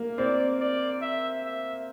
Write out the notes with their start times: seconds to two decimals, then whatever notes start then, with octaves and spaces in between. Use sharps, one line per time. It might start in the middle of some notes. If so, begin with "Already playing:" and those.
Already playing: A#3
0.18 C4 D5
0.61 D5
1.02 E5
1.45 E5